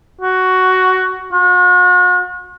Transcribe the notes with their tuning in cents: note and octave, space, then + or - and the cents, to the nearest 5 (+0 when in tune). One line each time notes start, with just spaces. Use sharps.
F#4 +10
F#4 -45